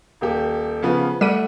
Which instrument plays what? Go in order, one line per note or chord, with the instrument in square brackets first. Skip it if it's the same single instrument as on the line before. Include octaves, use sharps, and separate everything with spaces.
[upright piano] D#1 A#3 G4
C#3 F3 B3
[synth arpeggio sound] G3 [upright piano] A3 F#5 D#7